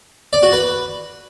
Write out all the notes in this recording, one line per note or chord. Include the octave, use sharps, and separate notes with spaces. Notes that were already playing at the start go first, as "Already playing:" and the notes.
D5
F#4
B4